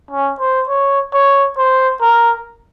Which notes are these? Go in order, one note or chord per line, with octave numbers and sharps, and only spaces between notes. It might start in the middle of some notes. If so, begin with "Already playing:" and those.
C#4
C5
C#5
C#5
C5
A#4